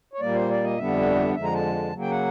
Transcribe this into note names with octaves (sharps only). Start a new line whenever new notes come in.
C#5
A#2 G3 A#3 D5
C5
D5
D#5
F2 D3 G3 B3 D4 E5
F2 D3 F3 G#3 E5
A#5
A5
C#3 F#3 A#3
G5
F#5